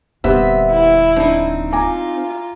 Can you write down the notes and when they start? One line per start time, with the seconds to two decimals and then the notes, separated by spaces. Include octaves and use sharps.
0.24 D#1 D3 B3 C4 G4 E5
0.72 E4
1.16 C4 D4 D#4
1.72 F4 G#5 A#5 D6